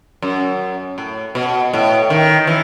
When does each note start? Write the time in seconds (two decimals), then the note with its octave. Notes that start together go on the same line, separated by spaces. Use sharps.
0.22 F#2
0.98 A2
1.35 B2
1.73 A2
2.10 D#3
2.47 E3